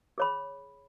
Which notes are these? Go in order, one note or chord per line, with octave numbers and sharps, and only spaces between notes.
G#4 C#5 B5